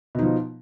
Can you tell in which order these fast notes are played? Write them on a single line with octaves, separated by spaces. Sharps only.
B2 D#4 F3